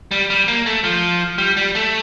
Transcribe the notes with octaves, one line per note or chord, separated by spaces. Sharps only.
G3
G3
A#3
A3
F3
G3
G3
A3